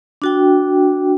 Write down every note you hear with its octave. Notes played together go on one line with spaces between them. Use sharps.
D4 F#4 G5